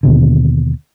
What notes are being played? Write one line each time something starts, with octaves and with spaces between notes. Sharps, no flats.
D#2 B2 D3